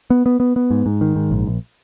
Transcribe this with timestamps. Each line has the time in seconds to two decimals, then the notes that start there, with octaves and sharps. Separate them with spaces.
0.10 B3
0.26 B3
0.40 B3
0.56 B3
0.71 G#2
0.86 G#2
1.01 D#3
1.16 G#2
1.31 A#1
1.47 A#1